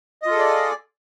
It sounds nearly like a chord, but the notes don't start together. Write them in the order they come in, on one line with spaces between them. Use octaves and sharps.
D#5 F4 A4 G#4 D5